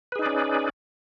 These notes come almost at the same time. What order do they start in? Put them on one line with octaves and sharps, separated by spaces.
B4 G#4 D#4 D5 C#4